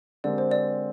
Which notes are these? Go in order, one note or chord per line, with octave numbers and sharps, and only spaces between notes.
D3 G#3 C4 G4 A#4 D5
C5
D5